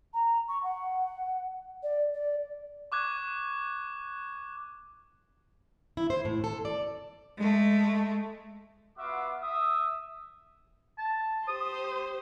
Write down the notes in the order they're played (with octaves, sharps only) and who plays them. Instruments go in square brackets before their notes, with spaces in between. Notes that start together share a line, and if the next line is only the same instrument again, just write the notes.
[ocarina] A#5
C#6
F#5
D5
D5
[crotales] C#6 D6 F#6 G#6
[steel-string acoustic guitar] E4
C5
A2
A4
D5
[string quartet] G#3 A3
[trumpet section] B3 F4 F#4 E5 D6
E5 D#6
[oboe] A5
[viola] G4 C5 [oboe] D#6